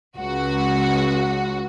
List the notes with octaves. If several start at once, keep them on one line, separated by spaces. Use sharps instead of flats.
C#2 F#4